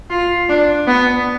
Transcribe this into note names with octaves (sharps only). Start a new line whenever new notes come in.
F4
D4
B3